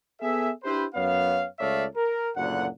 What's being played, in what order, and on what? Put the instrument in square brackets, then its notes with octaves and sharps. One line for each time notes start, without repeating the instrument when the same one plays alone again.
[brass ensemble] B3 G#4 A4 E5
D4 E4 G4 B4 C5
F#2 B3 C#5 F5
C#2 A3 C#5 D5 E5 F5
A#4
F#1 D2 A#2 F#5